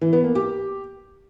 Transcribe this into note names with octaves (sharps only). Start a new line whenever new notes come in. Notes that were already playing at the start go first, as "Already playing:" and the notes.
E3
B3
A#3
G4